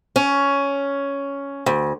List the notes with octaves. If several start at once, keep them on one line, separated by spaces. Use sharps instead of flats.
C#4
D2